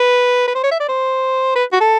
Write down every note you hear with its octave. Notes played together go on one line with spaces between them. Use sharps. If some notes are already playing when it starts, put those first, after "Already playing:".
Already playing: B4
B4
C5
C#5
E5
D5
C5
B4
F#4
A4